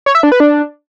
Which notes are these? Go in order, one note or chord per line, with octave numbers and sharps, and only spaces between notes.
C#5
E5
D4
B4
D4